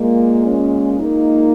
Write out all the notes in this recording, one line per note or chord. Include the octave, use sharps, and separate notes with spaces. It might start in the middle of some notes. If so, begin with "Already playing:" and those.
Already playing: A#2 G#3 A#3
C#4
A#2 G#3 A#3 D#4